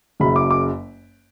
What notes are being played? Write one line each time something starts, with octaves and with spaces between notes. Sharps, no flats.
F#1 F#2 C#3 B5
D6
D6